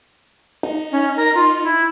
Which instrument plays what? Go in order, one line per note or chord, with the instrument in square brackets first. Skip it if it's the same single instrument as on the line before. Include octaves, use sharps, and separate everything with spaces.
[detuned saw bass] D#4
[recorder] C#4
A#4
F4
E4